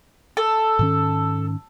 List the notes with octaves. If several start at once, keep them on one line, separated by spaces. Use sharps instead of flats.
A4
G#2 D#3 C#4